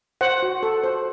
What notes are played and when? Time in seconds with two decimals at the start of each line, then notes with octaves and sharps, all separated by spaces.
0.21 C5 F#5
0.43 F#4
0.63 A4
0.84 C5